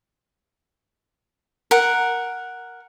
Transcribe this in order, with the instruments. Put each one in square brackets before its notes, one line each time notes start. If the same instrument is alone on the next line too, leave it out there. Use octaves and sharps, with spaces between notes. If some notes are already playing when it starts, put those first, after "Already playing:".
[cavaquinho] A#4 F#5